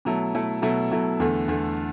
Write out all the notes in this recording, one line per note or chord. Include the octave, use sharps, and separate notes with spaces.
B2 F#3 A3 E4 A4
B2 F#3 A3 E4 A4
B2 F#3 A3 E4 A4
B2 F#3 A3 E4 A4
E2 D3 A3
E2 D3 A3